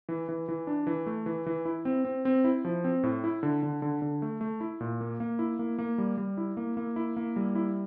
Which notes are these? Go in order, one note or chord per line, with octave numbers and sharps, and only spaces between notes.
E3
E3
E3
D4
E3
A3
E3
E3
E4
C4
C4
C4
E4
F3
C4
A2
E4
D3
D3
D3
D3
A3
A3
E4
A#2
A#3
A#3
E4
A#3
A#3
G3
G3
E4
A#3
A#3
E4
A#3
G3
E4